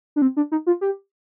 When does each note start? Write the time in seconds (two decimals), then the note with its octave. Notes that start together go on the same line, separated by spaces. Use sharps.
0.16 D4
0.22 C4
0.37 D4
0.52 D#4
0.66 F4
0.81 G4